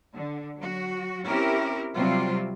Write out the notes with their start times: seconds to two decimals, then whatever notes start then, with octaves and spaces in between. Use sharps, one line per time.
0.15 D3
0.59 F#3 F#4
1.27 C4 C#4 E4 G4 A#4
1.95 C3 F#3 G3 C4 F4